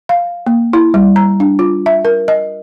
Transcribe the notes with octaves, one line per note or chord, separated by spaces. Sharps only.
F5
A#3
E4
G3
A#5
D4
F4
E5
A#4
D#5